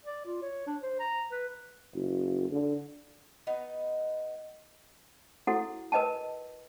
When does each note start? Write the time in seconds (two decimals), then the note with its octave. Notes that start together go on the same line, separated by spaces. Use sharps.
0.05 D5
0.26 F4
0.42 C#5
0.67 D4
0.82 C5
1.00 A#5
1.31 B4
1.95 F#1
2.50 D3
3.47 B3 D#4 D#5
5.47 E4 F#4 A4 F#5
5.92 A#4 B4 D#5 G5 A5